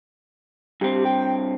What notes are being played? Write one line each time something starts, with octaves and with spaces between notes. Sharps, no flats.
G2 C4 G4
G5